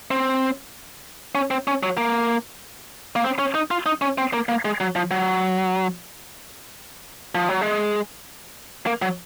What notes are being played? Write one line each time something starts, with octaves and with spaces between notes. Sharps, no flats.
C4
C#4
C4
C#4
F#3
A#3
A#3
C4
C#4
D#4
F4
D#4
C#4
C4
A#3
A#3
G#3
F#3
F3
F#3
F3
F#3
G#3
A#3
F#3